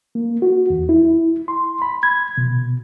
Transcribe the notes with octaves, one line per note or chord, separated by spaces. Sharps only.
A#3
F#4
E2
E4
C6
B5
G#6
B2